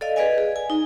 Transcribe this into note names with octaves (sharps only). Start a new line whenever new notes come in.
A4 D5 D#5 F5
G#4 B4 D5 D#5 F5 G#5
G#4
G#5
D#4